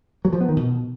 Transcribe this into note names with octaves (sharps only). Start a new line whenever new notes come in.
F#3
F3
B3
D#3
B2